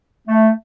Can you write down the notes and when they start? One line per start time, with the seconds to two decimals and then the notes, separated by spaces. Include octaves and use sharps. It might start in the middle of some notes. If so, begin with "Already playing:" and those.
0.28 A3